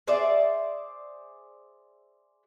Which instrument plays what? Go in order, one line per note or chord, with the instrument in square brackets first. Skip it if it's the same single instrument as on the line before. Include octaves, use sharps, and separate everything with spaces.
[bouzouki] G#4 C5 D5 E5